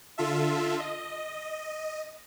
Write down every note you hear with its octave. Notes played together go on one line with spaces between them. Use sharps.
D3 F4 A4 E5
D#5